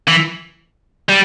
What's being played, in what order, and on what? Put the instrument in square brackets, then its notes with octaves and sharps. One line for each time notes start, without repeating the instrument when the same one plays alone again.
[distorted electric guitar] E3
G3